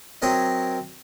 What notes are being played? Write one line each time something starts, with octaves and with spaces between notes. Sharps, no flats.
F#3 C4 A#4 C#5 D#5